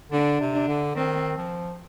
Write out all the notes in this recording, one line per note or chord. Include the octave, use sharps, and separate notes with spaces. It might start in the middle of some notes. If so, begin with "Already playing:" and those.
D3 D4
C3
D4
D3
D#3 C4
F3